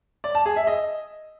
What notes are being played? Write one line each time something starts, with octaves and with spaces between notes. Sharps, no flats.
D5
A5
G#4
E5
D#5